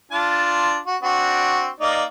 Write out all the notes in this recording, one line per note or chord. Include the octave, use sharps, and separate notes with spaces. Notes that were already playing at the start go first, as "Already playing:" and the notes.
D4 F4 A5
F#4
C4 D4 F#4
A#3 D#4 D5